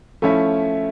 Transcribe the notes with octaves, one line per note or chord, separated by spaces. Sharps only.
F3 A3 C#4 E4